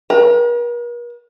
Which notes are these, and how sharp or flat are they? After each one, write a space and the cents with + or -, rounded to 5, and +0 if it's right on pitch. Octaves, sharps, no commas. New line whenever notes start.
A#4 +45 A#5 -15